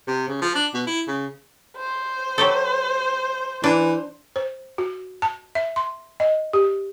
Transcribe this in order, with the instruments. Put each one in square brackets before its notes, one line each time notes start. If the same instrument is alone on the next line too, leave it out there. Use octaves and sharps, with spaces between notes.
[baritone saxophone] C3
C#3
F3
D4
B2
E4
C#3
[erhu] C5
[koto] F#3 G4 A4
[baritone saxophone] E3 [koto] D4
[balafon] C5
F#4
A5
E5
C6
D#5
G4